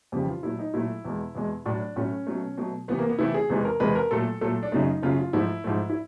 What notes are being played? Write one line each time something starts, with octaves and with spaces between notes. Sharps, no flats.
F2 C#3 E3 G3 G4
F4
A#2 F#3 A3 E4
D#4
A#2 F#3 A3 E4
E2 B2 G#3
E2 B2 G#3
A2 F#3 A3 D4
A2 F#3 A3 C#4
B2 F#3 A3
B2 F#3 A3
C3 E3 A3 B3
A#3
B3
C3 E3 A3 E4
G#4
E2 C3 E3 G#3
A#4
E2 C3 E3 G#3 B4
A#4
A#2 F#3 A3 A4
A#2 F#3 A3 A4
D4
F#2 C#3 F#3 A3 D#4
F#2 C#3 F#3 A3 F4
F4
G#2 F3 A3 E4
G#2 F3 A3
E4